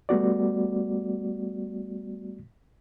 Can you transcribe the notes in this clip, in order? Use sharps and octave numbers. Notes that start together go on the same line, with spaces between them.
G3 A3 B3 F#4 D5